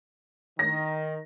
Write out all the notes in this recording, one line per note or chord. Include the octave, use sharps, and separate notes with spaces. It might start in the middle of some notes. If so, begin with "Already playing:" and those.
D#3 A#6